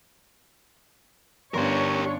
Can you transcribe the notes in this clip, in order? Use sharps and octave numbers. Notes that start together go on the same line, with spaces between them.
G1 C#4 D4 G4 A#4 C#5 C6